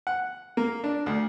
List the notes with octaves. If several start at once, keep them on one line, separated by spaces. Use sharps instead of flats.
F#5
A#3
D4
D2